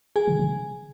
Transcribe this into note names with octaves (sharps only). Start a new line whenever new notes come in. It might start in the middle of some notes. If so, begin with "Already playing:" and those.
G#4 G#5
C3
C3